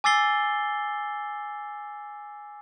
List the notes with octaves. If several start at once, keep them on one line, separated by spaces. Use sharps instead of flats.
G#5 D6 E6 A6 C7 G7